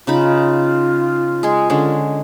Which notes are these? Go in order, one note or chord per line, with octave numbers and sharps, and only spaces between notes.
C#3 D#4 F4 B5
G#3 G#4 G#5
D3 G#3 C#4